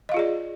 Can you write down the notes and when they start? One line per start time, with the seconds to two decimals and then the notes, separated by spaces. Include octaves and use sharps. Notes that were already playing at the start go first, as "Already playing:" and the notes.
0.09 D#5
0.12 F5
0.14 F4
0.17 G#4
0.19 D5